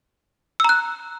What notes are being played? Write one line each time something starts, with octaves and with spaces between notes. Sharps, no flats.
A#5 E6 F#6